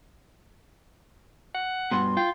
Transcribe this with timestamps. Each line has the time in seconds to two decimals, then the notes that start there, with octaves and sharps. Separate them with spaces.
1.55 F#5
1.91 G2 B2 C6
2.17 F4 G5